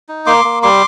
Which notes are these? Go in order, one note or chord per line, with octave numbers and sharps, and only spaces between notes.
D#4
A#3 C6 D6
A#3
G3 C6 D6